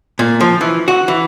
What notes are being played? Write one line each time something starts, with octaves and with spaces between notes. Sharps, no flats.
A#2
F3
E3
F#4
E3